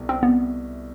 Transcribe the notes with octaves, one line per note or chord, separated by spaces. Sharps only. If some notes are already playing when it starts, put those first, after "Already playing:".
Already playing: C2 B2 A3
C4
B3